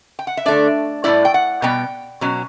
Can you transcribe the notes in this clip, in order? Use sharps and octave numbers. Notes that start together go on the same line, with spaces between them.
G5
F#5
E5
D3 A3 D4 D5
A2 G3 C#4 E4 D5
G5
F#5
B2 G3 B3 G5
B2 F#3 C#4